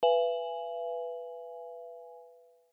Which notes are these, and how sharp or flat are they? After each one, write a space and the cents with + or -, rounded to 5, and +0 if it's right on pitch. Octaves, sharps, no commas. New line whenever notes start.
B4 +0 E5 +45 G#5 +0